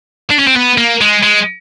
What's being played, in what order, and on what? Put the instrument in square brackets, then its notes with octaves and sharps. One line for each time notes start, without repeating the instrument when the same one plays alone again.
[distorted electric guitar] D4
C#4
C4
B3
A#3
G#3
G#3